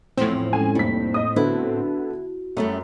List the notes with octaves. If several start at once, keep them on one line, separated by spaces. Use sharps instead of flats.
E2 A2 F3 C4
G#3 C#4 A4 G#5
F1 G3 A#3 B6
D#5 D#6
D3 B3 E4 F#4
F#2 G3 A3 C#4